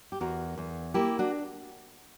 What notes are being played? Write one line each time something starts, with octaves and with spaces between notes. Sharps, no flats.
G4
E2 F#4 A#4
E2
A#3 E4 G4
D4 F#4